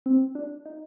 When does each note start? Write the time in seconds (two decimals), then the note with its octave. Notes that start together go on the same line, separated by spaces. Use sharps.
0.06 C4
0.35 D4
0.65 D#4